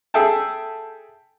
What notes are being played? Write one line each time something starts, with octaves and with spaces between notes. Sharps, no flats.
G#4 A4 E5 G5 A5